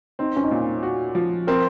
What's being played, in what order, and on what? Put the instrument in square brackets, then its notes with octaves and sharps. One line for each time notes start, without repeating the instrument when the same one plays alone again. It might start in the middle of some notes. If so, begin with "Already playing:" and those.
[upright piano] C4 [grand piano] D#4
[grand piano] C#4
D#4
[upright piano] A#2 [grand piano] F4
[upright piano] F#4
F3
[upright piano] C4 [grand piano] A#4